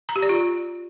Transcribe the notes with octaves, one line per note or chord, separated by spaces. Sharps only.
A#5
G4
D5
F4